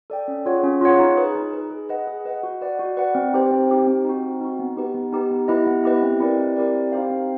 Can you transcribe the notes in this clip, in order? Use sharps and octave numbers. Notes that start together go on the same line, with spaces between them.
A4 D5 G5
C#4
F4 G#4 C#5 F#5
C#4
F4 G#4 C#5 F#5
D#4
G#4 B4
D#4
G#4 B4
G#4
B4 D#5 F#5
G#4
B4 D#5 F#5
F#4
B4 D5 F#5
F#4
B4 D5 F#5
C4
D#4 G4 C5
C4
D#4 G4 C5
C4
D#4 F#4
C4
D#4 F#4
B3
D#4 G4 B4
B3
D#4 G4 B4
B3
E4 G4 B4 D#5
B3
E4 G4 B4 D#5
C4
E4 G4 A#4 D5
C4
E4 G4 A#4 D5
C4
D#4 G4 C5 F5
C4